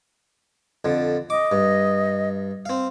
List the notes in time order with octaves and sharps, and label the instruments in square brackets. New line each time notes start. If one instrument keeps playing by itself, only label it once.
[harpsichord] F2 D3
[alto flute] D#5 [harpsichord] D6
[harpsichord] G2
C4 F5